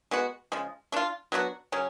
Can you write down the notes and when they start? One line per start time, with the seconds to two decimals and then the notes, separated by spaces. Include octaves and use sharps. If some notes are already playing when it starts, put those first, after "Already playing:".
0.11 G#3 B3 F#4
0.52 C#3 F3 G#3
0.92 A3 D4 F4
1.32 F#3 B3 D4 F#4
1.72 C#3 F#3 C#4